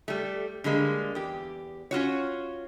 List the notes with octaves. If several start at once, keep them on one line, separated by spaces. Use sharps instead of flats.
G3 A3
D3 G3 G#3 A#3
E2 G4
C#4 F4 F#4 C#5